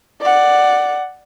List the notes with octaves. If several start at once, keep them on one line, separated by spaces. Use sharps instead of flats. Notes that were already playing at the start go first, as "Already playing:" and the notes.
D5 F#5